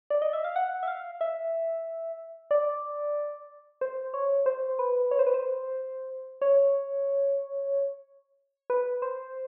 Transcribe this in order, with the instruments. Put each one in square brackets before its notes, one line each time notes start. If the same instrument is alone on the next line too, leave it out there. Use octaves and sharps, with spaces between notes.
[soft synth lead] D5
D#5
E5
F5
F#5
E5
F5
E5
D5
C5
C#5
C5
B4
C#5
C5
B4
C5
C#5
B4
C5